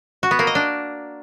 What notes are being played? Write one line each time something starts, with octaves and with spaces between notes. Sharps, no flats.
F#4
B3
A#3
D#5
D4